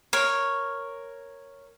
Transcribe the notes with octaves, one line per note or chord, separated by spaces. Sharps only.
A#4 C#5